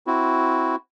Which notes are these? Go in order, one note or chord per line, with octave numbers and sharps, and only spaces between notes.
C4 E4 F#4